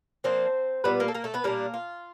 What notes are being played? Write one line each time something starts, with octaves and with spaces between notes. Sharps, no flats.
F3 A#3 C4 D4 C5
A#2 G3 B3 B4
A#3 A#4
A4
A#3 A#4
A3 A4
B3 B4
A#2 G3 A#3 D4 A#4
F4